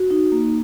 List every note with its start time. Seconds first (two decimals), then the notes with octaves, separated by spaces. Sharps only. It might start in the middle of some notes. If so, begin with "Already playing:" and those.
Already playing: F#4
0.11 D#4
0.32 A#3